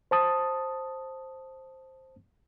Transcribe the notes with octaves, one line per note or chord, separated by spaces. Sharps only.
C5 A5 D#6